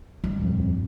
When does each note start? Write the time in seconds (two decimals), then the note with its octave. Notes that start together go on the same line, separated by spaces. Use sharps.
0.24 G2
0.39 D#1 F2